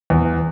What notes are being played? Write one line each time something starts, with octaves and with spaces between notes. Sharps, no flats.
E2